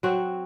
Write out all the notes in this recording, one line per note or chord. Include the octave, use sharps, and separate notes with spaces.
F#3 C4 F#4